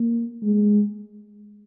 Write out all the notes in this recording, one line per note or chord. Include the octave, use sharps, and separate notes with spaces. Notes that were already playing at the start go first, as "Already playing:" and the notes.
Already playing: A#3
G#3